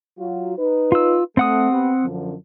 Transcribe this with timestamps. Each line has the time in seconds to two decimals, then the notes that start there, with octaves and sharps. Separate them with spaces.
0.19 F#3 F4 F#4
0.58 D#4 B4
0.92 F4 E6
1.37 A3 C4 F#5 D#6
1.71 B3 G4 B4
2.03 F#2 D3 F3